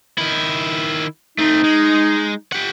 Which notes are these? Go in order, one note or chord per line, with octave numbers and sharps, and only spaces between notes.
D#3 E4
A3 C4 D#4
G#3
G4 F#5